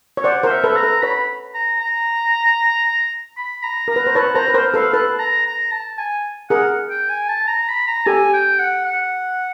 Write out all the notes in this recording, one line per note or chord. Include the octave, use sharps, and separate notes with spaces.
C#5
C5 D5 F#5
A#4 C5
E5
A4 B4
A#5
A4 B4
B4 C#5 B5
A#5
A#5
B5
A#5
A#4 A#5
B4
C5
B4 C#5 A5
A#4 C5 A#5
B4
A#4 C5
A4 B4 F5
A4 B4 A5
A#5
A#5
A5
G#5
G#4 A#4 F#5
G5
G#5
A5
A#5
B5
A#5
G4 A4 G#5
G5
F#5
F#5